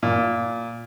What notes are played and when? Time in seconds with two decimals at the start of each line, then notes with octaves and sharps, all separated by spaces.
0.03 A#2